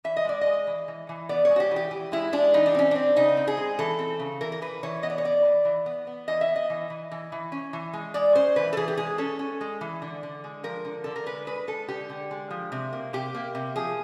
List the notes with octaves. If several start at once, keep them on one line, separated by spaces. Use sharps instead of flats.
E3 E5
D#5
G#3 D5
G#3 D#5
E3
E3
E3
B3 D5
G#3 C#5
F#4
G4
E3
G4
E3
G#3 E4
G#3 D4
E3 D#4
D4
C4 C#4
C4 D4
C#3 D#4
C4
G#4
G#3
E3 A4
C4
C#3
E3 A#4
A#4
E3 B4
E3 C#5
B3 D#5
D5
C#5
B3 D5
E3
E3
B3
B3
E3 D#5
E5
B3
D#5
E3
E3
E3
E3
C#4
E3
G#3
G#3 D5
C#4 C5
E3 B4
A4
E3 G#4
G4
G#3 G#4
C#4 A4
C#4
G#3
E3
D3
D3
G#3
F3 A#4
D3
D3 A4
A#4
G#3 B4
G#3 B4
G#3 A4
D3 G4
D3
G#3
F3
C3
A#3
C3 G4
A#3
C3
F3 G#4